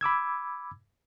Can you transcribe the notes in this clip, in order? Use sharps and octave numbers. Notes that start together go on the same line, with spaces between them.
B5 D6 E6 G#6